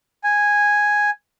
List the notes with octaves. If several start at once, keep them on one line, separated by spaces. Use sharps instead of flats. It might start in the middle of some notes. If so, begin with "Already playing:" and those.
G#5